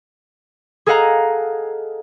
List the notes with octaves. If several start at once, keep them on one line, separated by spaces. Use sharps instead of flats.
G#4 A4 D#5 F5 F#5 A#5